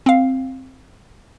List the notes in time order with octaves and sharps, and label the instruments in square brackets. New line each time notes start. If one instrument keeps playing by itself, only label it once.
[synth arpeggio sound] C4 F5